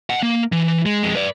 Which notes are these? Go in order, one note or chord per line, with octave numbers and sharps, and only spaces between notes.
D#5 F#5
A#3
E3
G#3
F2 G#3
B4 D5